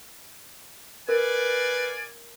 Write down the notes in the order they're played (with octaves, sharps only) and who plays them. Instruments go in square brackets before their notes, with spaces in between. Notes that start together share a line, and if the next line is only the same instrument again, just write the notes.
[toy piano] A#4 [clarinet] B4 [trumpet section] D5 F5 G#5